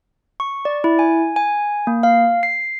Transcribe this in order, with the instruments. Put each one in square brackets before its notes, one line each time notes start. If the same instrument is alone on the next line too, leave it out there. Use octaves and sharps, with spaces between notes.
[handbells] C#6
D5
E4
G#5
G#5
A#3
F5
C7